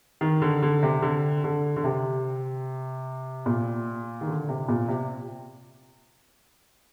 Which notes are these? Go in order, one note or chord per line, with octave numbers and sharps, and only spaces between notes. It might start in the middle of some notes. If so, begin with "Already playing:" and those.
D#3
D3
D3
C3
D3
D3
D3
C3
A#2
D#3
D3
C3
A#2
C3